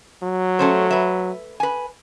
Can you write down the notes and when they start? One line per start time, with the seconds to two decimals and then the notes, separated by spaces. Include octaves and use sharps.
0.23 F#3
0.59 A3 C#4 C5
0.91 B4 E5
1.60 B4 G#5